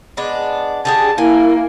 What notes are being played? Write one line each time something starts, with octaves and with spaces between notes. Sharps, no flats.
G#3 B3 D4
D3 G4 G#4 A5
A#3 E4 G#5